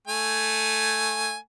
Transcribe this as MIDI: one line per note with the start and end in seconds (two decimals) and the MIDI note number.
0.07 1.36 57
0.07 1.36 80